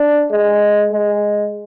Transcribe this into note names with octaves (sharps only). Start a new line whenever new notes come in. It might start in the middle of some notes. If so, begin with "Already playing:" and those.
Already playing: D4
G#3
G#3